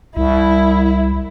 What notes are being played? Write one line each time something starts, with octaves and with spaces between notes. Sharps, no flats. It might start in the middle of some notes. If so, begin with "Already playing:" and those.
C2 E4